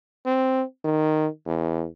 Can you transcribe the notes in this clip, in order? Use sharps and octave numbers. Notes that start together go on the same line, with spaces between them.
C4
D#3
E2